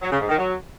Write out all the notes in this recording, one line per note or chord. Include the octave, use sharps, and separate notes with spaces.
F#3
C#3
G#2
D#3
F#3